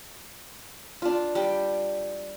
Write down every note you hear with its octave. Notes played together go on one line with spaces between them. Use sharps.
D4 F4
G3 G5